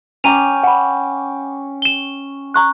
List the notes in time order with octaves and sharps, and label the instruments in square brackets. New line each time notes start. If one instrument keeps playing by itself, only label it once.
[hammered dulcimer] C#4 G5 D6 [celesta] A#5 D#7 F7
[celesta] F#5 B5
E7 G7
A#5 C#6 F#6